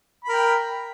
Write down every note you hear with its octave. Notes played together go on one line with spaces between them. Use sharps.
A#4 G5 B5